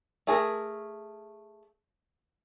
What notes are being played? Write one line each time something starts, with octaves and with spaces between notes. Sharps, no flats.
A3 G#4 A#4